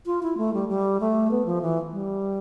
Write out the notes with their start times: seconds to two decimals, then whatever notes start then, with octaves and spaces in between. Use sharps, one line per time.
0.06 F4
0.23 E4
0.37 A3
0.54 G3
0.69 G3
1.00 A3
1.31 B3
1.46 F3
1.62 E3
1.92 G3